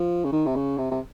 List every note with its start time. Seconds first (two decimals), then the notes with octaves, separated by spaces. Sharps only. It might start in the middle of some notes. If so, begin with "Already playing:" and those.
Already playing: F3
0.25 C#3
0.32 D#3
0.46 C3
0.56 C#3
0.78 C3
0.91 C3